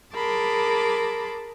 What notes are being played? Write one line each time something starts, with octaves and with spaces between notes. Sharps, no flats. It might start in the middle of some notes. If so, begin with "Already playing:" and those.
G#4 A#4 A5 B5 C6 D6